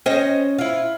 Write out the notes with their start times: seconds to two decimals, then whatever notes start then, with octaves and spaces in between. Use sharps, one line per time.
0.06 C#4 C5 D#5
0.58 E4 F4